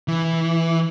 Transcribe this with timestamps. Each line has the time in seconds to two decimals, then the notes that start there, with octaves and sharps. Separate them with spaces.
0.08 E3